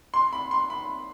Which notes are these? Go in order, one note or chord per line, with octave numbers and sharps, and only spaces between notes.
C6
B5
C6
B5